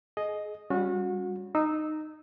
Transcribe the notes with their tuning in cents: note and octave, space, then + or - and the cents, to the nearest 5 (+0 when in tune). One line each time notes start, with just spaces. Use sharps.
G#4 +30 D#5 +0
G3 +10 C#4 +0 F#4 -30
D#4 -15 E6 -20